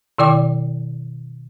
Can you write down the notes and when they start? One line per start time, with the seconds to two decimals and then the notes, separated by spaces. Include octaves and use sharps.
0.18 B2 D#3 E4 D5 G5 D6